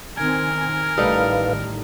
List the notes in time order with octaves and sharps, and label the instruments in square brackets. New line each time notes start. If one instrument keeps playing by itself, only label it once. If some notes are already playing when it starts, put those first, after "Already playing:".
[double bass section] D#3 C4 [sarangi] A#4 [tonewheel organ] G#5
[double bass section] A1 A2 D#3 [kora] G3 D#4 A4 [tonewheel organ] B4 F5